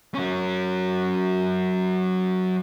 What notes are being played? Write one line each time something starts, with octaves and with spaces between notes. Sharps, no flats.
F#3 C#4